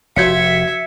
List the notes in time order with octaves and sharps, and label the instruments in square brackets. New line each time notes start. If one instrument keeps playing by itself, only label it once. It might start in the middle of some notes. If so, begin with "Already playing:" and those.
[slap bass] F1 [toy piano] F#4 C#5 F5 [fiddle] E5 [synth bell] G#6 B6 C#7